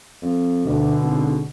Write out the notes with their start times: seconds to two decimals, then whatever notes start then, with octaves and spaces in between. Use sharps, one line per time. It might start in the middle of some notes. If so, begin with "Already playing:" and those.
0.22 F2
0.66 D2 B2 D3
1.02 G#1